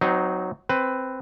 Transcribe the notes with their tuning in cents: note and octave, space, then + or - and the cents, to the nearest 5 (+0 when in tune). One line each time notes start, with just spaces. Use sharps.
F#3 +0 C4 -30 D#4 +0
C4 +0 B4 +15